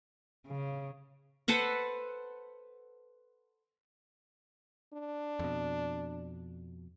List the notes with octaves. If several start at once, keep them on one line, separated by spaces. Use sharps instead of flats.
C#3
A4 B4 C5 F#5
D4
F2 B2